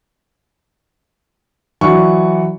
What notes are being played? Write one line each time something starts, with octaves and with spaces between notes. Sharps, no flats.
E3 F#3 D5 C#6